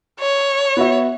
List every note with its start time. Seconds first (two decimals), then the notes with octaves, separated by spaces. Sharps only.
0.20 C#5
0.77 B3 F#4 E5